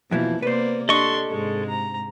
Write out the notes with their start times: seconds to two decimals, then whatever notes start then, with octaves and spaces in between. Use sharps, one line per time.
0.11 F2 B2 E3 F3 A#3 E4
0.42 C3 A#3 B3 B4 C5 D5
0.89 D4 G4 A4 D#5 C6 C#6
1.29 G#2 C3 G#3
1.69 A#5